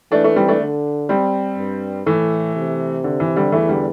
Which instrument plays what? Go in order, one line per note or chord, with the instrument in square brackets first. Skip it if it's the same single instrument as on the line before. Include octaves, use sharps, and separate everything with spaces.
[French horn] E3 [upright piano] A3 D4
[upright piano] A3 D4
G3 C4
A3 D4
[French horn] D3
[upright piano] G3 C4
[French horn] G2
[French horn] A2 [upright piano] E3 A3
[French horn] C3
[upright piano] D3
E3
D3 G3
[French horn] E2 [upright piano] E3 A3
[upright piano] D3 G3